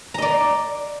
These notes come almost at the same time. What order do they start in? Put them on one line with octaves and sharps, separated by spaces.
A#5 D#5 D5